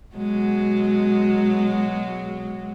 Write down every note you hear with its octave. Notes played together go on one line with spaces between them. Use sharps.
B2 F#3 G#3